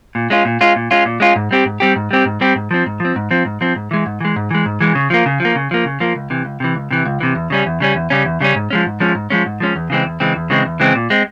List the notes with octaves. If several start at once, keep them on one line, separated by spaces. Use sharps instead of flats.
A#2
G#3 C#4 F4
A#2
G#3 C#4 F4
A#2
G#3 C#4 F4
A#2
G#3 C#4 F4
G#2
G3 C4 G4
G#2
G3 C4 G4
G#2
G3 C4 G4
G#2
G3 C4 G4
G#2
F3 C4
G#2
F3 C4
G#2
F3 C4
G#2
F3 C4
G#2
E3 G#3
G#2
E3 G#3
G#2
E3 G#3
G#2
E3 G#3
C#3
F3 A#3
C#3
F3
A#3
C#3
F3 A#3
C#3
F3 A#3
C#2
C3 E3
C#2
C3 E3
C#2
C3 E3
C#2
C3 E3
E2
C#3 G3 C#4
E2
C#3 G3 C#4
E2
C#3 G3 C#4
E2
C#3 G3 C#4
G#2
F3 G#3 C#4
G#2
F3 G#3 C#4
G#2
F3 G#3 C#4
G#2
F3 G#3 C#4
E2
C#3 E3 G#3 C4
E2
C#3 E3 G#3 C4
E2
C#3 E3 G#3 C4
E2
C#3 E3 G#3 C4
A#2
G#3 C4